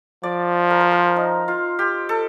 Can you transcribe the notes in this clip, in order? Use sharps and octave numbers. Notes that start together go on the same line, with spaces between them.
F3 D5
A#4
C5
A#4
D#4
F4
G4
A4